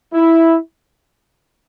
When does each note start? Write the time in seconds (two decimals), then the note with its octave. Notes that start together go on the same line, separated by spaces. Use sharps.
0.13 E4